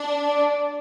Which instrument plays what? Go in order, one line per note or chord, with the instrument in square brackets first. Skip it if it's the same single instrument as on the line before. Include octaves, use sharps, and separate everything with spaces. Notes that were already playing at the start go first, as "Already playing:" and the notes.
Already playing: [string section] D4
[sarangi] D5